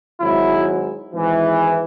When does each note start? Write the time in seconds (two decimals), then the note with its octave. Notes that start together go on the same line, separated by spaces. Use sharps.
0.21 G#1 G#2 F#3 E4
1.13 G#1 G#2 E3